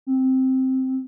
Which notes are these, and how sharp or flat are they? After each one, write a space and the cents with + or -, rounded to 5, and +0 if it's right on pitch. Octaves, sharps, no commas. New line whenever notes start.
C4 +0